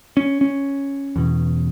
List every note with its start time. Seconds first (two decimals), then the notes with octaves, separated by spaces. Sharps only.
0.17 C#4
0.41 C#4
1.16 E2 B2